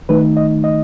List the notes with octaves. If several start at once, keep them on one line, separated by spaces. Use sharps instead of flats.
D#3 A3 D#4 B4
D#5
D#5